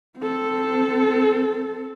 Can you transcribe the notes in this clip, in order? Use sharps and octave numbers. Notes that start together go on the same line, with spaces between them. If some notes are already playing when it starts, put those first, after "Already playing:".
C4 A4